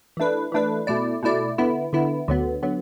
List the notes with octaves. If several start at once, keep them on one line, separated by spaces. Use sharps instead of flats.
E3 A3 D4 B4
E3 A3 D4 B4
B2 A3 E4 D5
B2 A3 E4 D5
D3 B3 E4
D3 B3 E4
D2 D3 F#3 B3
D3 F#3 B3